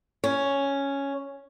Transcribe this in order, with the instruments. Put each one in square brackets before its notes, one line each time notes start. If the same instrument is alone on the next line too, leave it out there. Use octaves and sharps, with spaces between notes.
[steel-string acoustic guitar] C#4